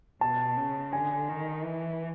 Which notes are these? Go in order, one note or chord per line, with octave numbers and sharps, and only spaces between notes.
B2 A5
C#3
D3 G#5
D#3
E3